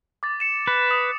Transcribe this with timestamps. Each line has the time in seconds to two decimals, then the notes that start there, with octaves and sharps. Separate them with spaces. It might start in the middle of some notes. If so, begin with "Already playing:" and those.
0.23 D6 A6
0.40 C#7 E7
0.67 B4
0.91 D#6